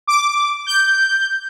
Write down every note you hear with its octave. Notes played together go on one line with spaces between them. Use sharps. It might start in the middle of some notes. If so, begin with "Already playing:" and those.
D6
G6